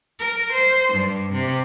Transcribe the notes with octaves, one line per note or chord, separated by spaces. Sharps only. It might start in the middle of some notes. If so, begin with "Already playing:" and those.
A#4
C5
G2
C3